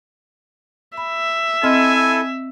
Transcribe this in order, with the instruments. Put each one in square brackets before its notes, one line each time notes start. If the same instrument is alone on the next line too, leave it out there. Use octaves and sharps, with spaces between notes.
[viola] E5 [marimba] B5
[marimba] C4 D#5 F6 [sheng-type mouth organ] E4 A4 [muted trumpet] G#5